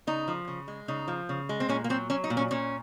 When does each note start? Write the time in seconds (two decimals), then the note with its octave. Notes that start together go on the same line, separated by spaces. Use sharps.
0.07 C#3 D#4
0.28 F3
0.48 C#3
0.68 G#3
0.88 C#3 D#4
1.08 F3
1.29 C#3
1.49 G#3
1.60 C4
1.69 A#2 C#4
1.84 A#3
1.89 F#3 C4
2.10 F#3 C#4
2.24 D#4
2.30 A#2
2.37 C#4
2.51 A#2 C#4